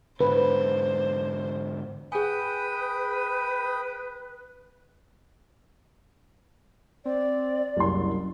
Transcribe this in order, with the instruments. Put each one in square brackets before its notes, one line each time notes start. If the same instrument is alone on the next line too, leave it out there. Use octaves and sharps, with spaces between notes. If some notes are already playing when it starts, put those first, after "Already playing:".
[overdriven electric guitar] G#2 D3 [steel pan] B4 [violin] C5
[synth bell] G#4 G#5 [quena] B4 [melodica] G5 B5 D#6
[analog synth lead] C4 [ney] D5
[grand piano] F#1 C2 C6 [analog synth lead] F#2